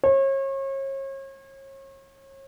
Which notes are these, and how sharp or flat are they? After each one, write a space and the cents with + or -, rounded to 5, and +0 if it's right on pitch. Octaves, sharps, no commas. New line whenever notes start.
C#5 -35